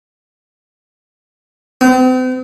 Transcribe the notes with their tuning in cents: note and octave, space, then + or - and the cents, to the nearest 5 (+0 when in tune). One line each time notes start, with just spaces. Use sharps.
C4 -40